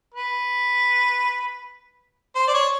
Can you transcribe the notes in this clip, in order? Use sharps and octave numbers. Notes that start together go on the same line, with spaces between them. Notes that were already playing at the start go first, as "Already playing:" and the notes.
B4
C5
D5
C#5